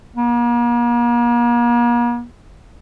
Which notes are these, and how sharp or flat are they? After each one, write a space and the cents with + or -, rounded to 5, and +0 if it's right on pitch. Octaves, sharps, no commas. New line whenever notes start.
A#3 +40